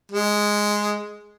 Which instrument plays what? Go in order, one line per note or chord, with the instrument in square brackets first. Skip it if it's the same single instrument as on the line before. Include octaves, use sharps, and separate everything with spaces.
[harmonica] G#3